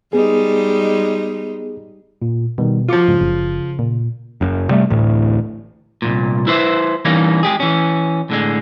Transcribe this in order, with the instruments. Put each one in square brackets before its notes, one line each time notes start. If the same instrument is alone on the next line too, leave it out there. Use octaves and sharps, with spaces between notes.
[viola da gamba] G3 G#3 D#4 [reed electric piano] B3 G#4
[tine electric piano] A#2
[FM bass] B2 [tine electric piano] D#3 G3
[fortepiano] F3 F4 [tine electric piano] F#4 D6 C#7
[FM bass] G#2 [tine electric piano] C#3
[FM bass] F#1
A#2
[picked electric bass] F#1 F#2
C3 G3 A3
A1 D2 A2
[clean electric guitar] C2 G2 A#2
E4 B4 C5 E5
E3 G3 A#3 C#4 D#4
G#3 G4 G#4
E3 C#4
A2 D3 G#3